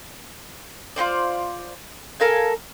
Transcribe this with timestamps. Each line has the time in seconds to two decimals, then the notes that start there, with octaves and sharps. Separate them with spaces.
0.96 F4 F#4 C5 D5
2.20 A4 A#4 F5 G#5